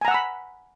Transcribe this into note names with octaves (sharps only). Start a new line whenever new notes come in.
F#5 G#5 A#5 B5 E6